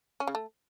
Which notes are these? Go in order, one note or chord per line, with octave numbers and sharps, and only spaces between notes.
C#4
C#3
A3